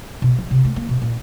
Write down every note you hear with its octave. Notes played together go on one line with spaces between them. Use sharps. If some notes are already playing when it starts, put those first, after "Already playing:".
B2
F3
C3
A3
A#3
B2
A#2